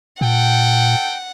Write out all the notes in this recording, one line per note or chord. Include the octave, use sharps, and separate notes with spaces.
A#2 A4 F#5 G5